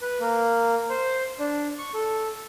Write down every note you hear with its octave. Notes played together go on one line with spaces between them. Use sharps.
B4
A#3
C5
D4
C#6
A4